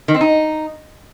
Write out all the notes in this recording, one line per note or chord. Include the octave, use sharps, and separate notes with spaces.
D#3
C4
D#4